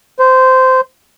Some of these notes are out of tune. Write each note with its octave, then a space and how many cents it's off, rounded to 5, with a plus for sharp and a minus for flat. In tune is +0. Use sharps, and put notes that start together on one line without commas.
C5 -15